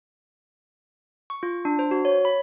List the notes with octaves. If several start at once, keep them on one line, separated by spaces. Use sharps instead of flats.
C#6
F4
D4
C5
F#4
C#5
B5